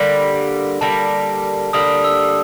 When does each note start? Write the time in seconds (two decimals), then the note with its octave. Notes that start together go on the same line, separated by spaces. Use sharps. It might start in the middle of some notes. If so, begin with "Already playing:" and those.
Already playing: D3 G3 A#3
0.81 D3 G3 A#3 A5
1.73 D3 G3 A#3 D#6
2.04 E6